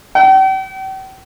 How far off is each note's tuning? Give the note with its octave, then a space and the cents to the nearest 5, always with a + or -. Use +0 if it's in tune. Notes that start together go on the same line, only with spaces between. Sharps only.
G5 -40